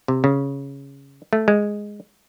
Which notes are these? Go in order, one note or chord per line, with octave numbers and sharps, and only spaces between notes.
C3
C#3
A3
G#3